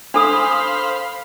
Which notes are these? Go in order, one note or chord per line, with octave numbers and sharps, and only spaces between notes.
D4 A4 C5 F5 B5 D#6